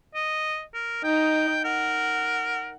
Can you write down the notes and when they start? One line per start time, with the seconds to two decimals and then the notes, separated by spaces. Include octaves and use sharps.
0.15 D#5
0.74 A#4
1.04 D#4 G5
1.64 A#4 F#5